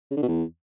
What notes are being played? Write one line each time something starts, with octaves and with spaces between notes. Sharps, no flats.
C#3
D3
B2
E2